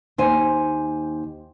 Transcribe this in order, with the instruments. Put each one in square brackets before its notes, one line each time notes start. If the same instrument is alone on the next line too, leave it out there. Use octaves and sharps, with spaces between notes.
[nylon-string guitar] D#2 C5 G#5